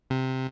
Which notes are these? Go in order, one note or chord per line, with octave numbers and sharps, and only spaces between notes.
C3